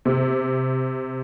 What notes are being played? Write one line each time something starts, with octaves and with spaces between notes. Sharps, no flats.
C3